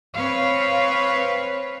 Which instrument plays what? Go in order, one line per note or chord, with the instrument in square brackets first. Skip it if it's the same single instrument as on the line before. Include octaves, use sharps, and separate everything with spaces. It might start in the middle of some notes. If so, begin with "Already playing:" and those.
[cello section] C4 B4 C#5 F5